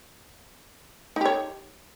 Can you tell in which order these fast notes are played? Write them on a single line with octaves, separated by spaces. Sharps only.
D#4 G4 C#5